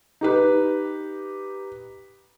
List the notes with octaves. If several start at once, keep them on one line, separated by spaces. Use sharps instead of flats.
D#4 G4 B4